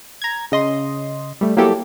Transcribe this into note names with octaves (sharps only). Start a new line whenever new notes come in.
A#5 G#6
C#3 D#5 C6
G3 A3
F#3 A#3 B3 E4 G4 A4